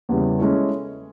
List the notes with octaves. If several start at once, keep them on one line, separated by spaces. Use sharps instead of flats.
E2 C#3 E3 G3
G#3 C#4 E4 A4 C#5